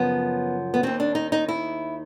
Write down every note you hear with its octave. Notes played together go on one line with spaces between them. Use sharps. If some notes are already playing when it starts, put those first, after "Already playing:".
Already playing: F#2 C#3 F3 B3
B3
D#2 D#3 C4
D4
D#4
D#4
E4